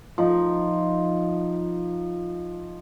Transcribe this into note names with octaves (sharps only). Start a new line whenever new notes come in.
F3 D#4